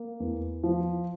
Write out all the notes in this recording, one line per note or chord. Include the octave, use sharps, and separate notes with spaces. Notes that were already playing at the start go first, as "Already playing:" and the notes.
Already playing: A#3
E2
F3